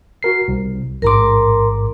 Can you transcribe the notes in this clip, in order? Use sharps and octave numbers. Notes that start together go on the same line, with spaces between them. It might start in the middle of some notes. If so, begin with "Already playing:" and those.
F#4 A#4 C7
C2
A1 G#2 A#4 A#5 C6 D6